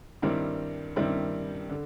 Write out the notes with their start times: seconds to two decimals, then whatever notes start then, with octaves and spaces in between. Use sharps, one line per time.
0.22 G2 D#3 G3 C4 E4
0.96 G2 D#3 G3 C4 E4
1.69 D3